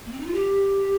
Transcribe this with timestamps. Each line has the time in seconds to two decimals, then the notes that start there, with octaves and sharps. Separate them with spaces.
0.05 A#3
0.12 C4
0.20 D#4
0.26 F4
0.34 G4